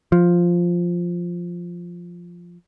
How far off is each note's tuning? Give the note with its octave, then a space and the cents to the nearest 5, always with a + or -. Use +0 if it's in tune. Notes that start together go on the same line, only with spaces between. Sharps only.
F3 +0